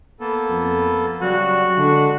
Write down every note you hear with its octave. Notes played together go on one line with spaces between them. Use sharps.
A#3 B3 A4
F2
C#3 F#3 G3 F#4
D3 G#3 D4